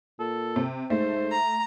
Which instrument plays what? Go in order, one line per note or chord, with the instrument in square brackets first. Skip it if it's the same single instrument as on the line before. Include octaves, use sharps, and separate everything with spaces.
[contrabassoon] A#2 [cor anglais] A4
[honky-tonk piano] C3
[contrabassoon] G#2 [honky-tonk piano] A3 [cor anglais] C5
[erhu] A#5